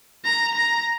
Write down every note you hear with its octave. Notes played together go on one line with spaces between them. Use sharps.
A#5
A#5